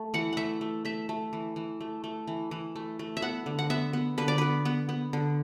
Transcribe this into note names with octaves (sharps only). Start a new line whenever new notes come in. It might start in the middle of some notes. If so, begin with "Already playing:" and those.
Already playing: A3
E3 F#5
A3 E5 F#5
A3
A3 E5
A3
E3
E3
A3
A3
E3
E3
A3
A3
E5
B3 F#5
D3
F#5
B3 E5
B3
D3 B4
D5
B3 B4
B3
B3
D3